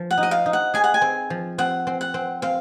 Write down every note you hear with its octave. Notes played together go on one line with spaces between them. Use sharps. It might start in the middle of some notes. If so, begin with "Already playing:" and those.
Already playing: F3
F#5
D#4
D#5
F5
D#4
F#5
G#4 G#5
F#5
G#5
C4
F3
C4 F#5
C4
F#5
C4
C4 F5